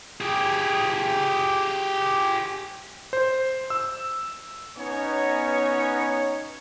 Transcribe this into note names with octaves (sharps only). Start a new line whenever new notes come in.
G4 G#4
C5
E6
B3 C#4 D#4 C#5